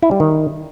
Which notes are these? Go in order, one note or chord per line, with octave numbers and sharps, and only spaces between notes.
E4
G3
D#3